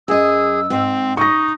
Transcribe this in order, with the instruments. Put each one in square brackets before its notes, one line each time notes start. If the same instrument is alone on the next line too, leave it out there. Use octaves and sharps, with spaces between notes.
[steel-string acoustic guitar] F#2 D#5 [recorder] G#4 [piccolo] E6
[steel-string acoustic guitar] G#2 [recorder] C4
[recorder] D#4 [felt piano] C#6 A#6 [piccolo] D#6